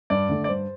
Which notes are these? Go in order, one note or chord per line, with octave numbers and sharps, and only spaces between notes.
G2 D5
D3 A3
D5
G2 C5